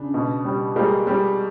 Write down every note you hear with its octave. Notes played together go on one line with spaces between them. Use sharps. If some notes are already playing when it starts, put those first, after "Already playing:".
Already playing: C#3 D4
B2
G3
G3 G#3 A#3
G3